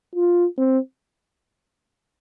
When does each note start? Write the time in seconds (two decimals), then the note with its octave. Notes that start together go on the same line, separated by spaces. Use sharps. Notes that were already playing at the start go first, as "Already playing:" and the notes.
0.15 F4
0.58 C4